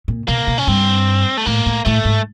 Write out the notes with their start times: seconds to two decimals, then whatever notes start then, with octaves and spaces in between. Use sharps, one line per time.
0.08 A#2
0.28 B2 A#3
0.47 B2
0.58 C#4
0.67 G2 C4
1.37 A3
1.46 A2 A#3
1.66 A2
1.85 A2 A3
2.05 G#2